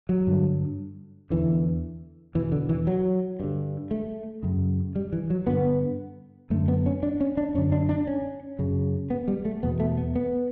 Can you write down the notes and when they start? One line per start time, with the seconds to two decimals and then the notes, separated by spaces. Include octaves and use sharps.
0.09 F#3
0.27 G2 D3
1.30 E2 D3 E3
2.35 E2 B2 E3
2.52 D3
2.69 E3
2.87 F#3
3.40 G2 D3
3.91 A3
4.43 F#2 C#3
4.96 G3
5.13 E3
5.30 F#3
5.47 G2 D3 B3
6.50 F#2 D3 A3
6.68 B3
6.86 C#4
7.03 D4
7.21 C#4
7.37 D4
7.54 F#2 C#4
7.58 D3
7.72 D4
7.89 D4
8.07 C#4
8.59 F#2 C#3
9.10 B3
9.28 G3
9.45 A3
9.63 E2 B2 B3
9.80 A3
9.98 B3
10.16 B3